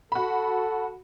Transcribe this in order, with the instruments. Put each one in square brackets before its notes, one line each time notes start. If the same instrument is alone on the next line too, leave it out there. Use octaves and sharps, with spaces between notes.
[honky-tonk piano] F#4 B5 [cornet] A4